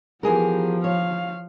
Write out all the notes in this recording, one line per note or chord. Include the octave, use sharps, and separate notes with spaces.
E3 F3 B3 G4 G#4 A#4
C#5 F5